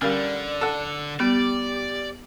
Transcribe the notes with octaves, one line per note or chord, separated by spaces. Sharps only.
D3 G3 C#4 A#4 D5 F5 F6
A4 F#5
G3 B3 G4 D5